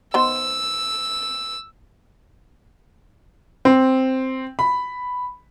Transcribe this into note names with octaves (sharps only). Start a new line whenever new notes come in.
D#3 B3 C5 E6
C4
B5